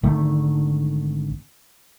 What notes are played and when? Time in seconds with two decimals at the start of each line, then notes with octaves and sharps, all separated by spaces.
0.03 G#1 D3 D#3 A3